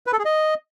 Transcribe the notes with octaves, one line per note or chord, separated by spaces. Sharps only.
B4
A4
G#4
D#5